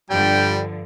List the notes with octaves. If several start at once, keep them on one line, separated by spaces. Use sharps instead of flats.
G2 D3 F3 G3 G5